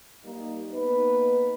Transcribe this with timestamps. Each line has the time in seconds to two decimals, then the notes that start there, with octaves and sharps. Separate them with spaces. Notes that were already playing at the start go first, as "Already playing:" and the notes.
0.25 G3 A#3 D#4
0.71 A#3 B3 D#4 B4